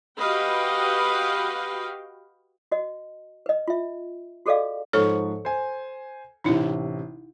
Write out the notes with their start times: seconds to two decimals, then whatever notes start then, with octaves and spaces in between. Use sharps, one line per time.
0.19 F#4 G4 B4 D#5 F5 G5
2.72 F#4 D#5
3.46 B4 D#5
3.68 F4 E5
4.46 F#4 G#4 A4 D5 D#5 F5
4.93 G#2 F3 A4 C#5 C#6
5.45 C5 G#5
6.44 A1 C3 D#4 E4